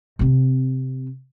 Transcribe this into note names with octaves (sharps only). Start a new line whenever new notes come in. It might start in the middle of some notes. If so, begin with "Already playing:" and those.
C3 C4